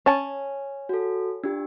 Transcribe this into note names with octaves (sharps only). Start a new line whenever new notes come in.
C#4 A5
F#4 A4
D4 F4 G4